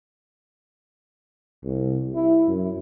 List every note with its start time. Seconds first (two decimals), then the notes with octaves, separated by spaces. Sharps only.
1.63 C2
2.15 E4
2.48 F#2